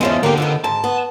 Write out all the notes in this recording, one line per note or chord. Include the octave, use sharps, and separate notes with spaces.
C#3 F3 G#3 B3 E4
D3 A#3 G4
F2 D#3 B3
G#2 A5
B3